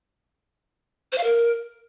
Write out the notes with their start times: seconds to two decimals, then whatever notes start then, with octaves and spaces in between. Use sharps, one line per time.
1.12 C5
1.18 F5
1.23 A#4